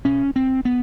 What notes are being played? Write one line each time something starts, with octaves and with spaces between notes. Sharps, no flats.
B2 C#4
C4
B3